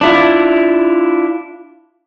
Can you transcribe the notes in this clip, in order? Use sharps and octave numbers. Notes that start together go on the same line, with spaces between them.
D4 E4 F4